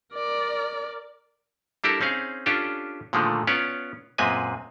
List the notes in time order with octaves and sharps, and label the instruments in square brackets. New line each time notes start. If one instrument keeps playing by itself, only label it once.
[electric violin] A#4 D5
[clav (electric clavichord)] G3 D4 E4 G4 A4 A#4
C4 C#4 D#4 G#4 F5
C#4 D4 F4 G4 A4
A#2 D3 D#3 F3 G#3 A3
B3 C#4 F4 C#5 D5
F#2 A#2 G#3 C4 B4 G#5